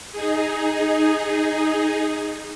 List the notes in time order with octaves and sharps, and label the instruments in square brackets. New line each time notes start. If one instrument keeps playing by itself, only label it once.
[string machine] D#4 G#4